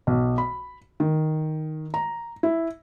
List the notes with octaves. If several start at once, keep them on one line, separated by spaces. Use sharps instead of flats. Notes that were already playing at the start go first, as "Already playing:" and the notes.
B1
B5
D#3
A#5
E4